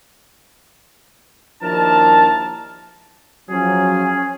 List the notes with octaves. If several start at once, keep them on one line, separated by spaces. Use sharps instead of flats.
D#2 F3 D4 E4 A#4 A5
F3 F#3 C#4 G#4